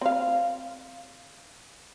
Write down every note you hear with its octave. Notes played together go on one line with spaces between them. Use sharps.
C4 F5